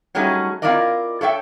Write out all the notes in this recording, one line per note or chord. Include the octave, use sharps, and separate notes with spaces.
F#3 G3 A3 C#4 D#4 G#4
C4 E4 F4 A#4 D5 D#5
A4 C#5 E5 G5